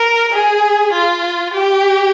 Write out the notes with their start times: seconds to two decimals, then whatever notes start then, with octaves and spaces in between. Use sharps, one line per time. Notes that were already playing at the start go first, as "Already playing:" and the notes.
Already playing: A#4
0.32 G#4
0.93 F4
1.53 G4